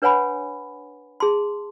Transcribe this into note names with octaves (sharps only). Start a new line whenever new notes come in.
D4 B4 C#5 F#5 G#5 B5
G#4 A5 C6